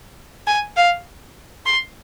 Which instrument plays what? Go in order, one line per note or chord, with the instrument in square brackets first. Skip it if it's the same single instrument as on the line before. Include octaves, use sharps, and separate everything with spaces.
[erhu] G#5
F5
C6